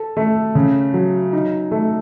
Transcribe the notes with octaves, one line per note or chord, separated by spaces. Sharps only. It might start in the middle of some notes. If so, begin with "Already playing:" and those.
Already playing: A4
A3
C#3
F#3
D#4
A3